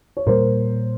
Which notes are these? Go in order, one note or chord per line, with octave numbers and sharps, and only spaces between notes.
C#5
A#2 G3 A#3 A#4 C5